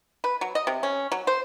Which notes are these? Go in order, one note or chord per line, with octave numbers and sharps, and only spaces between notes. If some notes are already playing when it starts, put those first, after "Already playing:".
B4
F#3
D#5
C3
C#4
F#3
C5